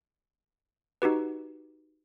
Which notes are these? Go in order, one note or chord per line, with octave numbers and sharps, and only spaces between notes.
D#4 F#4 G4 B4